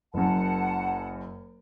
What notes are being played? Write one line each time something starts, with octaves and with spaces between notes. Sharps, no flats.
F#1 F#2 F#5 A5